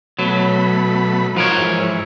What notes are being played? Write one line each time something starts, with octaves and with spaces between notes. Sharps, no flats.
B2 F#3 A3 B5
F3 D#4 F#4 A#4 C#5 F5
G#2 E3